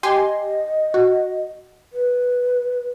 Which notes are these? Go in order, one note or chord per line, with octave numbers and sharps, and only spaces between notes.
G4 D#5 G#5 C6
F#4
B4